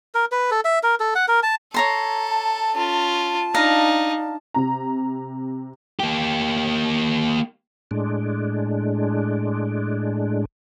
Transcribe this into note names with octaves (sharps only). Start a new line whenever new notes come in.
A#4
B4
A4
E5
A#4
A4
F#5
A#4
A5
A4 C#5 A#5 C6
A5
C#4 F4
D4 D#4 F5 A#5
C3 A#5
A#3 G4
A2 G#3 D4